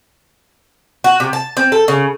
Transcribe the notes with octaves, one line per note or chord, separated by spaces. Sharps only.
F#4
C3
A5
C4
A4
C#3